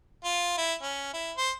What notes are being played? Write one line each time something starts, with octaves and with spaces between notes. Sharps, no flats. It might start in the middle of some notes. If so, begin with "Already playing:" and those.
F4
E4
C#4
E4
C5